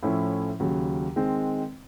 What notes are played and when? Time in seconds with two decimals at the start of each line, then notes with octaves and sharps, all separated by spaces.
0.03 A2 F3 A3 C#4 E4
0.60 D#2 C#3 F#3
1.16 D#3 G#3 C4